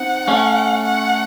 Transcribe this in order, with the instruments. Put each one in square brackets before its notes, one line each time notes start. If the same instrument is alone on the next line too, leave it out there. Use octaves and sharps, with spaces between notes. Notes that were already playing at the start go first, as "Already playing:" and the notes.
Already playing: [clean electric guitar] C4 D#4 [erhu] F#5
[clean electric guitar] A3 C#4
[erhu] F#5